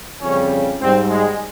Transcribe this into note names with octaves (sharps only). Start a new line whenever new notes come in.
F2 C#3 G3 C#4
G#2 G3 C4
G#3